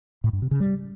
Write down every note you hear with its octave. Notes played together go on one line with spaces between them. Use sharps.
A2
G2
C3
C#3
G3